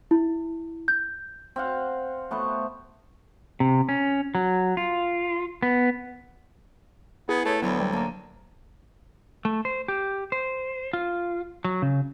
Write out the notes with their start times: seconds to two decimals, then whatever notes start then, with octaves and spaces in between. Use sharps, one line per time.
0.11 E4
0.88 G6
1.56 C4 F5 F#5
2.31 A3 B3 C5 C#6
3.60 C3
3.89 C#4
4.35 F#3
4.77 F4
5.62 B3
7.29 B3 E4 G#4
7.45 A3 B4 C#5
7.62 D2 F#3 B3
7.80 G3
7.93 A#3 A5 A#5
9.45 A3
9.65 C5
9.88 G4
10.32 C5
10.93 F4
11.65 F#3
11.82 C#3